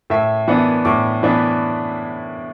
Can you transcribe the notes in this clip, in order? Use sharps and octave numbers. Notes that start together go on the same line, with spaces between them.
A2 E5
E3 B3 D4 F#5
A2 D6
E3 B3 D4